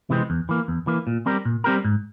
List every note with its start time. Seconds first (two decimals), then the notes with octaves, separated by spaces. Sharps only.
0.10 C3 E3 G#3 C4
0.30 E2
0.49 E3 A#3
0.68 E2
0.87 E3 A#3
1.07 A#2
1.26 G3 C4 G4 A#4
1.45 A#2
1.64 G3 C4 G4 A#4
1.84 G#2